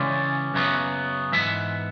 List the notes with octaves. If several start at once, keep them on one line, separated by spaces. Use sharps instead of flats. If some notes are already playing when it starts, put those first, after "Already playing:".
Already playing: C#3 E3 G#3 C#4 D5
F#2 C#3 F#3 B3
G#2 E3 B3 E5